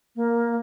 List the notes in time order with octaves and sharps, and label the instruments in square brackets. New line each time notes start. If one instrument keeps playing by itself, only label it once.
[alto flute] A#3